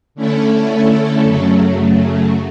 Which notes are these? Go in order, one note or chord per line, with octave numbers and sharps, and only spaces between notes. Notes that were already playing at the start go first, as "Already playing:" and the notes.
D3 A3 C#4 E4 A4
F#2 C#3 F#3 A3